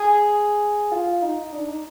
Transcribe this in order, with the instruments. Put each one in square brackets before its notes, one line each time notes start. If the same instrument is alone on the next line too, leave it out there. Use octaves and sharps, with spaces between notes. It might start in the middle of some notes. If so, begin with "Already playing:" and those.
Already playing: [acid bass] G#4
F4
D#4
D4
D#4